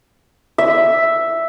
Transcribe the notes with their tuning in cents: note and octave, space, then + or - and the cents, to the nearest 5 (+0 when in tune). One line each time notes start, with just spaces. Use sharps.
E5 +0